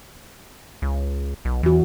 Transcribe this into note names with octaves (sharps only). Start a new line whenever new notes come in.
C#2
B1
E2 E3 F#4